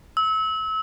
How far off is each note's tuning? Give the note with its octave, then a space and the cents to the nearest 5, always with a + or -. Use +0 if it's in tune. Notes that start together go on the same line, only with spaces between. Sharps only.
E6 -30